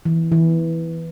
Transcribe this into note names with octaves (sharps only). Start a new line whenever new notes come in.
E3
E3